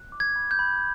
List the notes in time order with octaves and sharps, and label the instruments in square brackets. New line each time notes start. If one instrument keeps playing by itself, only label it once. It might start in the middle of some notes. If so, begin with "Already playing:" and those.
Already playing: [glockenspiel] F#6
D6
G#6
B5
G6
B5